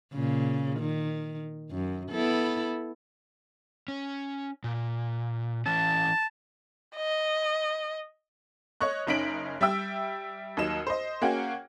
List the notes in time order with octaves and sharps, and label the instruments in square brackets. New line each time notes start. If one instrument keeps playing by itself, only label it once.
[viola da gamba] A#2 C#3
D#3
F#2
B3 E4 A4
[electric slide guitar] C#4
A#2
[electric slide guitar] E3 C#4 [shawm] A5
[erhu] D#5
[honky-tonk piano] C#5 D#5 C#6 F#6
F#1 C#4 D#4 B6 D7 F#7
G3 E5 G5 E6
D#2 F#3 D#5 E7
C5 D#5
A#3 C#4 F#4 G#4 F#5 G5